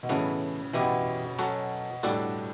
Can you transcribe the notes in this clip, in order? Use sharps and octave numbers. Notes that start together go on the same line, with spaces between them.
B2
A2 C#3 E3 B3 F#4 A4
B2 E3 B3 E4 G4
F#3 C#4 F#4 A4
A2 G3 D4 F#4 A4